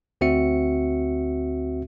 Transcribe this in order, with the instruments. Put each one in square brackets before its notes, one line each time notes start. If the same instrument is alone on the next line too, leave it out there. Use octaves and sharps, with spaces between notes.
[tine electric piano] D2 C4 F#4 E5 C#7